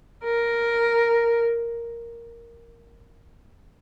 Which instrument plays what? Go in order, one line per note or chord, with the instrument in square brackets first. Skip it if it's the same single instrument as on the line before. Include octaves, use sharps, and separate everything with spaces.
[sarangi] A#4